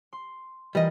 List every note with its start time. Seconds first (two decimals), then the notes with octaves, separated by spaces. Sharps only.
0.13 C6
0.75 E3 G3 F4 A#4 D#5